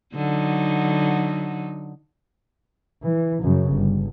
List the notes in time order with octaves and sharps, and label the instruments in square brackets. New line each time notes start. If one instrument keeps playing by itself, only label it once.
[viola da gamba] D3 F#3 D#4
[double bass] E3
F#2 C#3
G1